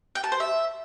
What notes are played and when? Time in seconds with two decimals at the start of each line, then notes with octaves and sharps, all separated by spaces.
0.15 G5
0.24 A5
0.32 C5
0.40 E5